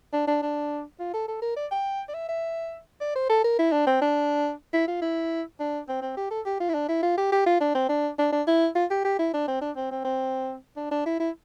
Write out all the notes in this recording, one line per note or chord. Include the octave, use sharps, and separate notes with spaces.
D4
D4
D4
F4
A4
A4
A#4
D5
G5
D5
E5
E5
D5
C5
A4
A#4
E4
D4
C4
D4
E4
F4
E4
D4
C4
C4
G4
A4
G4
F4
E4
D4
E4
F4
G4
G4
F4
D4
C4
D4
D4
D4
E4
F4
G4
G4
E4
D4
C4
D4
C4
C4
C4
D4
D4
E4
E4